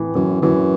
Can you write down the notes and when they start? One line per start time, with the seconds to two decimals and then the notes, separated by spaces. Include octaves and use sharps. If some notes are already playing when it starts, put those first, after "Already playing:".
Already playing: A2 E3
0.15 F#2 E3
0.42 F#2 E3